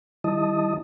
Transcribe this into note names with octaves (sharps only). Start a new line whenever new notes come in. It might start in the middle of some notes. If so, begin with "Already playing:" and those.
D#3 G3 E4 D#5 A5 D#6